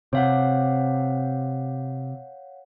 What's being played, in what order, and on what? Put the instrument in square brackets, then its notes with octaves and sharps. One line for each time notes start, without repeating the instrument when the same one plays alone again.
[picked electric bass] C3 [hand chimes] C#5 F5 F#5